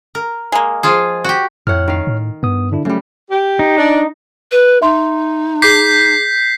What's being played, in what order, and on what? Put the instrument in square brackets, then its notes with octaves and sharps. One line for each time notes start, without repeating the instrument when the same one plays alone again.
[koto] A#4
[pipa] G#3 A#3
[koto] F3 F4 G#4
F#4 G4
[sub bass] F2 [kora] A2 F#5 [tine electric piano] C#5 F6
[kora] D#3 F5
[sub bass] A2
[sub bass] G2 [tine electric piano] B3 D#6
[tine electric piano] D3 D4 E4
[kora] C#3 G3 [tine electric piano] F#3 A3
[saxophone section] G4
[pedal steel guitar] D#4
[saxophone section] D4
[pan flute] B4
[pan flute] D#4 [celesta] E5 C6
[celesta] G#4 D6 [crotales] G6 B6 C7